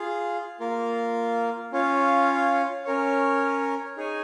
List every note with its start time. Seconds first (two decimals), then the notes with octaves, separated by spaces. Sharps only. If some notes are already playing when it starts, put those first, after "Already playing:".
Already playing: F4 G#4 F5
0.60 A#3 F4 A#4 F5
1.72 C#4 F4 C#5 F5
2.85 C#4 A#4 C#5
3.97 D#4 G#4 C#5 G#5